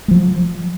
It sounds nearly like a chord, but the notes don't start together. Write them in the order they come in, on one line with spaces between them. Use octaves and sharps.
G#3 F3 F#3